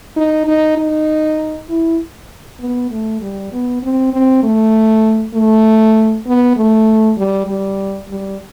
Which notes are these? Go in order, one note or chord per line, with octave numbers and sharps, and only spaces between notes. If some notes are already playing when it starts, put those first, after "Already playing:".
D#4
D#4
D#4
E4
B3
A3
G3
B3
C4
C4
A3
A3
B3
A3
G3
G3
G3